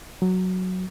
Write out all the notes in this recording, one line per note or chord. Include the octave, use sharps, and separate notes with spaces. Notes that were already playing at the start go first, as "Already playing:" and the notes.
F#3